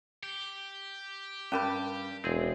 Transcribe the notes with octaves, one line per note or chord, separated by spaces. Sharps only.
G4
G2 G3 C#4 A#4 B5
E1 C4 G#4